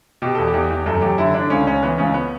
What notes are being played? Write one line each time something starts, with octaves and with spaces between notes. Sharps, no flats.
B2 G4
E2 A4
G4
E2
E2
F#2 A4
F#2 G4
D3 E4
D3 D4
C#2 C#4
C#2 C#4
E3 B3
C#2 C#4
B3